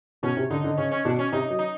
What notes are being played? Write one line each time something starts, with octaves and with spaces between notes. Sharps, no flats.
B2 C#4
C3
D3 D#4
D3
C#3 C#4
C#4
B2 D4
C#4
C3 D#4
F#3
D#4